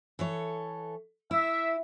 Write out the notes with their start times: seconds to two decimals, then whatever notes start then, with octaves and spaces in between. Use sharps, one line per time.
0.19 E3 A4 C#5
1.31 E4 E5